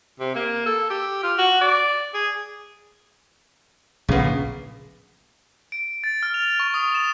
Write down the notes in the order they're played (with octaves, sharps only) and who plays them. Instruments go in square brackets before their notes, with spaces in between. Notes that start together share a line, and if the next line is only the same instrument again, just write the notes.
[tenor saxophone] C3
A#3
A4
G4
F4
F#4
D5
G#4
[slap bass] A#1 A2 [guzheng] C#3 B3
[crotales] D7
A6
F6
F7
C#6
D#6
E7